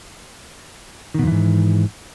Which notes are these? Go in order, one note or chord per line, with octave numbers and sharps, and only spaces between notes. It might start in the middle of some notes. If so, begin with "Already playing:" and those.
F2 G#2 B2 D#3 E3